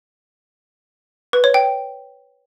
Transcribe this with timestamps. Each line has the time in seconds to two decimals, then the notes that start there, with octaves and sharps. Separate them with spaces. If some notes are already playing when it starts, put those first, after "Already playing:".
1.33 B4
1.44 C#5
1.54 G5